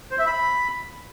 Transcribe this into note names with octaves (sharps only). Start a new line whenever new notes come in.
C5
E5
B5